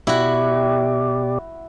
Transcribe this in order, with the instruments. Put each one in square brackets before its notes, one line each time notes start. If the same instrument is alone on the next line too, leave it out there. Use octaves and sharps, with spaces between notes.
[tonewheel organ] B2 G4 D5 [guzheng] E4 F#4